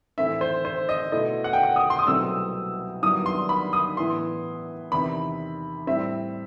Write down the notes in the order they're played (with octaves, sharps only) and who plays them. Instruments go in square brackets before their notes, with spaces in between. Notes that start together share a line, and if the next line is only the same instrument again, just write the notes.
[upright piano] A2 E3 A3 C4 E4 E5
C5
C5
D#5
B2 A3 E4 D#5
F#5
G5
F#5
D#6
C6
D#6
C2 B2 F#3 A3 C4 E6
G2 D#3 F#3 B3 E4 D#6
C6
B5
D#6
A2 E3 B3 E4 C6
E2 C3 D#3 B5
A2 G3 C4 E5